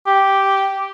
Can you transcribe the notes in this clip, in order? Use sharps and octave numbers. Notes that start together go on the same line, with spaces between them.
G4